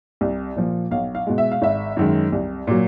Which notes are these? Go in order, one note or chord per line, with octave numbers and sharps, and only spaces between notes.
C2
A#2 F3
B1 F5
F5
B2 G#3
E5
F5
G#1 E5
F#2 D#3 G#3
C2
A#2 F#3